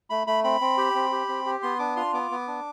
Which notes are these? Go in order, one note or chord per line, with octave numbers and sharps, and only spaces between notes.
A3 B5
A3 B5
C4 B5
C4
G4
C4
G4
C4
G4
B3 C6
D4 D6
F4 C6
B3 D6
B3
D4